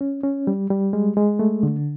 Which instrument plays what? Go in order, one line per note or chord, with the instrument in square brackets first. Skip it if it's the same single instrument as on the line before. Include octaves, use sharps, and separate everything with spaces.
[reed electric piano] C#4
C#4
G3
G3
G#3
G#3
A3
D3